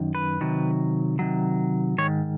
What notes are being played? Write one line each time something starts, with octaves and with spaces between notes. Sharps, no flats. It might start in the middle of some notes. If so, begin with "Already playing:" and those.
Already playing: F#2 D#3
B4
C3 D#3 F#3
C3 D#3 F#3
G#2 D#3 C#5